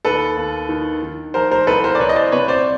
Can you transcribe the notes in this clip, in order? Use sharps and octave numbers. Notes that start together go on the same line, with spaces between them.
D#2 A4 B4
D#2
D#3
D#3
F3 A#4 C5
A#4 C5
C2 A4 B4
A#4 C5
D5
C2 B4 C#5
D#5
C5 D5
C3 B4 C#5
C5 D5